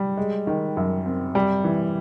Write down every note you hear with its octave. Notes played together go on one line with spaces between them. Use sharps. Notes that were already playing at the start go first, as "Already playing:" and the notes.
Already playing: G3
G#3
D#3
F#2
C4
G3
E3